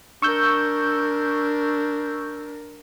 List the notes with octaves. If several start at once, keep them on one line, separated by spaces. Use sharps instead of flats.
D4 A#4 C#6 E6 G6